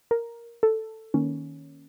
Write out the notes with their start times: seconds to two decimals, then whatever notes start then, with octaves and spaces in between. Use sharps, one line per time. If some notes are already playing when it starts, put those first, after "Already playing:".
0.11 A#4
0.63 A4
1.14 D#3 A#3 C#4